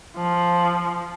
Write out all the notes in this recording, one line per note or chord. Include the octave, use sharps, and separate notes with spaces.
F3